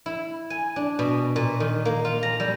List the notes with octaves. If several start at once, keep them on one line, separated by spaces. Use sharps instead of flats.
E4
G#5
D4
B2
A#2
D#3
A#3
F4
A#5
G3